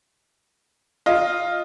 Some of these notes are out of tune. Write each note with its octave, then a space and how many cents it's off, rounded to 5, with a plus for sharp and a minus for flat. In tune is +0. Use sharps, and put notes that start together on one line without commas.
F4 +0 D#5 +0